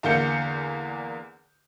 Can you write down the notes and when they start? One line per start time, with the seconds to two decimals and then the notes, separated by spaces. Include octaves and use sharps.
0.03 E2 D3 A#3 F5 G6 C#7